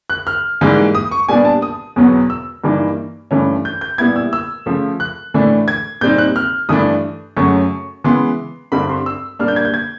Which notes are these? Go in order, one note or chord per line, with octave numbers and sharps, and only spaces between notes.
F#6
F6
G#2 E3 G3 A#3 D#4
D#6
C#6
A#2 G3 B3 D4 G#5
A5
D#6
E2 B2 F#3 B3
E6
G2 E3 G3 A#3 D#4
G2 E3 A3 C#4
G6
G6
A#2 G3 B3 E4 G#6
E6
E6
C#3 F3 A3
F#6
A2 E3 A3 D4
G#6
A#2 G3 C4 D#4 G6
F#6
F6
G2 E3 A3 D4 D#6
F#2 C#3 F#3 A3 C#4 C#6
C#3 E3 G#3 B3 C6
G2 D3 G3 C4 B5
C6
E6
A#2 G3 A#3 D4 F6
G6
G#6
G6
G#6